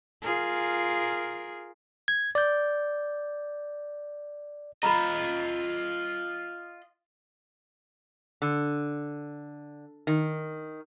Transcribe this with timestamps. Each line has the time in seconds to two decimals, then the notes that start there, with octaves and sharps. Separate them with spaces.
0.23 F4 G#4 A#4
2.08 G#6
2.35 D5 G6
4.83 F4 D#5 A#5 B5
8.42 D3
10.07 D#3